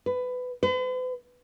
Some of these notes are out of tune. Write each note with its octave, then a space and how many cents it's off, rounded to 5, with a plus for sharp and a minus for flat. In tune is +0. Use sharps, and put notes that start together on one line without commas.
B4 +20
B4 +45